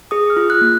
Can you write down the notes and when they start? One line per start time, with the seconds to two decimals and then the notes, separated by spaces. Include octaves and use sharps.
0.11 G#4 D#6
0.30 F6
0.37 F4
0.50 F#6
0.61 A#3